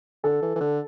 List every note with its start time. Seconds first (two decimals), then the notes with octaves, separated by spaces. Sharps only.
0.24 D3 A4
0.42 E3
0.56 E3
0.61 D3